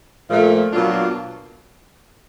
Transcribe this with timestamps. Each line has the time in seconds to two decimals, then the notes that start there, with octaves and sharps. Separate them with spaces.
0.28 A#2 F3 A3
0.71 B2 F#3 A#3 D4 F4